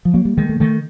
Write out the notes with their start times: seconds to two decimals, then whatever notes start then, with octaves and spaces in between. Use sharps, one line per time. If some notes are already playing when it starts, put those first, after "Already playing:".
0.05 F3
0.14 F#3 A#3
0.25 G3
0.38 D#3 G#3
0.49 A3
0.60 D#3 A3